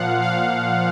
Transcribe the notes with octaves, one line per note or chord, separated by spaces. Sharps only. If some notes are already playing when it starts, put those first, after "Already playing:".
Already playing: A#2 F3 F5 F#5
F5